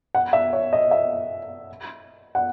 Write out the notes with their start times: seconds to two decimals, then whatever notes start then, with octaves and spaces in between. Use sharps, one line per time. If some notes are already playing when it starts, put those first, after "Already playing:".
0.15 F#5
0.33 E5
0.53 C#5
0.73 D#5
0.91 E5
2.35 F#5